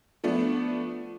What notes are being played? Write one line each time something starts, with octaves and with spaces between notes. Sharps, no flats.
F3 A3 B3 D4